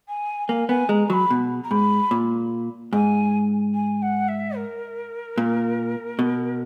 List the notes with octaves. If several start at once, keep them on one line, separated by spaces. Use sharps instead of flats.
G#5
A#3 G#5
B3 G#5
G#3 A#5
F#3 B5 C#6
B2
A#5
G#2 B5
A#2
G#2 G#5
G#5
F#5
E5
A#4
A#2
B2